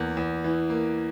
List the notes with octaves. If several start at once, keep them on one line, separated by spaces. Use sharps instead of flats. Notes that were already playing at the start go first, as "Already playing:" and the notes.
Already playing: E2 A#3
E2
E3
A#3